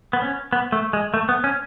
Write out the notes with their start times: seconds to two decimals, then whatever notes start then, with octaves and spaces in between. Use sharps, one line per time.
0.13 B3
0.22 C#4
0.53 B3
0.72 A3
0.93 G#3
1.14 A3
1.29 B3
1.44 C#4